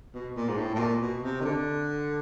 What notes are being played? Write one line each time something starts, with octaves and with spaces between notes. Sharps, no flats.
B2
A#2
G#2
A2
A2
A#2
B2
C3
D#3
D3